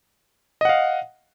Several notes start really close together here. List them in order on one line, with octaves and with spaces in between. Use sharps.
D#5 F#5 F5